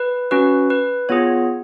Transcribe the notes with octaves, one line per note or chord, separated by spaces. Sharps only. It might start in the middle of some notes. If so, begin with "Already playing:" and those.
Already playing: B4
C#4 F#4 B4
B4
B3 F4 G#4 C#5